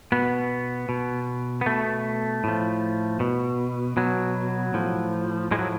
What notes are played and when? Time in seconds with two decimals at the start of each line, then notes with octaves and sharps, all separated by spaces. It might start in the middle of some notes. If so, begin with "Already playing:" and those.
0.12 B2 B3
0.89 B2
1.61 B3
1.66 B2 A3
2.44 A2 F3
3.20 B2
3.97 B2 F#3
4.74 A2 F3
5.51 A2 F3 G#3
5.59 F#3